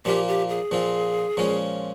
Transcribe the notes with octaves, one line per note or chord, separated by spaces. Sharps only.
A#2 F3 A#3 F4 G4
G4
G#4
A#2 F3 C4 F4
A#2 F3 G#3 C#4 F4